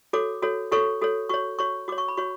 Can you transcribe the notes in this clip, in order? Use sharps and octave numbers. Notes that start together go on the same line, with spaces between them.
F#4 A4 C#5 D6
F#4 A4 C#5
F#4 A4 C#5 C#6
F#4 A4 C#5
F#4 C#5 C#6
F#4 C#5 C#6
F#4 C#5 D6
C#6
B5
F#4 C#5 C#6